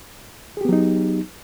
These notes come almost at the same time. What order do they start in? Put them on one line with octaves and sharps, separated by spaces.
G#4 G4 B3 F#3 D#4